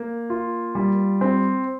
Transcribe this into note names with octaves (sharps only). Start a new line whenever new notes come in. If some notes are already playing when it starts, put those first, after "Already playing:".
Already playing: A#3
F4
G3
C4